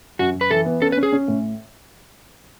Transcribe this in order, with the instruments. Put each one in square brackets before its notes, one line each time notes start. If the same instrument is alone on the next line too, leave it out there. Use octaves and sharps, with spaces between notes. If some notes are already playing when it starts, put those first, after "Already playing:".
[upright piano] F#2 [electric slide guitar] F#4
[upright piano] F#2
[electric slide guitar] B4
[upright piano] E3 [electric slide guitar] A4
[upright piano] B3
[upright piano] C#4 [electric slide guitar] A4
[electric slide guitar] B4
[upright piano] C#4
[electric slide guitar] G#4
[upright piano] C#4
A2